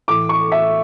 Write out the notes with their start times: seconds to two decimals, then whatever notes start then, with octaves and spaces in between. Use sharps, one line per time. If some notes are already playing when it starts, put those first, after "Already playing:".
0.08 A2 E3 A3 D6
0.29 C#6
0.52 E5